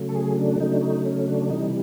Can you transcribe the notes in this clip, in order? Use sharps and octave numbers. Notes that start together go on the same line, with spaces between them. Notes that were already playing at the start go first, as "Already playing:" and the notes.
Already playing: C#3 F#3 A3
A4
G#4
D4
C#3 F#3 A3 D#4
D4
D#4
C#4
D4
C3 E3 G3 D#4